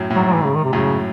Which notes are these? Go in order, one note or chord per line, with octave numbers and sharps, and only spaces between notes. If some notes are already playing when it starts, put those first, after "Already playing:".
Already playing: F#2 A2
A2
G#2 F#3
F#3
E3
C#3
D#3
C3
F#2 A2 C#3